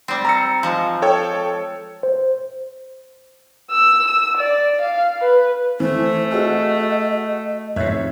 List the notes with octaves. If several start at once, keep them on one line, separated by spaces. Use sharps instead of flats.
G3 C4
A#5 E6 C#7
F3 G#3
A4 C#5 G5
C5
E6
E6
D5
F5
B4
E3 A3 C5
F#4 G#4 D#5 E6
F2 G#2 C#5 E5